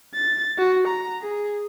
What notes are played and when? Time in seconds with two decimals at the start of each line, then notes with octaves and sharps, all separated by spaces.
0.15 A6
0.58 F#4
0.88 A#5
1.22 G#4